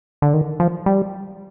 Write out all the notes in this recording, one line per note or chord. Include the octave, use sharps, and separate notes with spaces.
D3
D#3
F3
G3